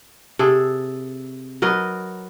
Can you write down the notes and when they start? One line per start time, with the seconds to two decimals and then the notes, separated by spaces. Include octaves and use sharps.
0.39 C3 G#4 A4
1.62 F#3 A#4 B4 D#5